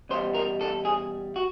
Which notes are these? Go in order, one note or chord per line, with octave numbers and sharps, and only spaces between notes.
E2 B2 G3 C5
A#4
A4
G#4
F#4